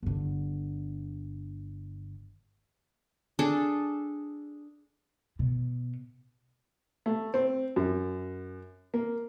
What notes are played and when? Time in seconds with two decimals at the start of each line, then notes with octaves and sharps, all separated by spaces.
0.03 G1 D3
3.39 D4 G#4 A4
5.39 B2
7.06 A3
7.34 C4
7.76 F#2
8.94 A#3